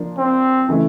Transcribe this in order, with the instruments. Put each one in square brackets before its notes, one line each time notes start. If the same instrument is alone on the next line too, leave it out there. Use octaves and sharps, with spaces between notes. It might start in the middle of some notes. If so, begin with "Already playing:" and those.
Already playing: [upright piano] F3 A#3 D4
[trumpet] C4
[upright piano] C#3 E3 A3